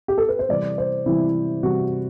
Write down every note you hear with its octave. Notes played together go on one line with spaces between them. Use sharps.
G4
A4
B4
C5
C3 E3 G3 D5
C5
C3 E3 G3 E4
C3 E3 G3 F#4